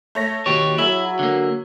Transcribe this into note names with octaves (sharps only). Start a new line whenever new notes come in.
A3 C#5 A#6
D#2 B2 G4 C#5
F#3 E4 G#4 E5
D3 A#3